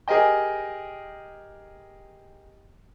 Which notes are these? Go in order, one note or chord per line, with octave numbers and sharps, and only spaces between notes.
G4 G#4 A#4 D#5 G5